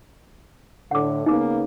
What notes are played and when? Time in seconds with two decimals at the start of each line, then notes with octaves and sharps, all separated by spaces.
0.91 A2 D3 F#5 D6
1.26 C#3 A#3 B3 D#4 D6